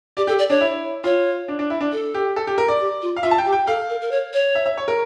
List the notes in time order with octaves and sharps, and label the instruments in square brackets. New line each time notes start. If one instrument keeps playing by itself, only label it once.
[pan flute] G4 [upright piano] D5
[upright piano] G4 [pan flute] A4
[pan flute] D5
[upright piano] D4 [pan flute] C#5
[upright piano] E4
[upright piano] F4 [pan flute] C#5
[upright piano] D4
D4
E4
D4
[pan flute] A4
[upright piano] G4
A4
G4
A#4
D5
[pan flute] G4
F4
[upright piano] F5
[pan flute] F4 [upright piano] E5
[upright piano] A5
G5
[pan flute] G4
[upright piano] G5
[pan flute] A4 [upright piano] F5
[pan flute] A#4
A#4
C#5
C#5
[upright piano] E5
E5
C#5
A#4